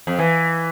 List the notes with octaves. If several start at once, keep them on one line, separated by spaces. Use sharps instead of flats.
F2
E3